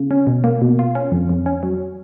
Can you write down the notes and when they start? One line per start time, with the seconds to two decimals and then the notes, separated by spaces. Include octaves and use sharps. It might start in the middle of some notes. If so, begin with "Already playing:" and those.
Already playing: C#3
0.11 C#4
0.27 B2
0.44 A#3
0.62 B2
0.79 F4
0.95 C#4
1.12 F2
1.29 F2
1.46 C#4
1.63 F#3